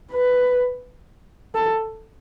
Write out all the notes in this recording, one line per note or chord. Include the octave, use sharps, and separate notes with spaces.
B4
A4